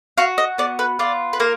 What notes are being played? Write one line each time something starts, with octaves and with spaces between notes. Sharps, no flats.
F#4 F5
D#5
B3 D5
B4
F4 D5
B4
A#3 A#4